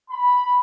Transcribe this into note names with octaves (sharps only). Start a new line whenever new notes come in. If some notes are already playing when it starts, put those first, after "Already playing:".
B5